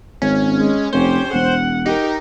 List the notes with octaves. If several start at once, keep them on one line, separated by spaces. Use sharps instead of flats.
G#1 C#4
G#3
F1 C#4 G4 C5
E1 F#5
D#4 G4 A#4